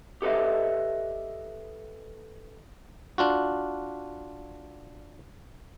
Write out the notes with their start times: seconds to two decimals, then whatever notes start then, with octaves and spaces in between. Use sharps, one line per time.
0.22 G4 A4 B4 D#5 E5
3.18 D4 F4 F#4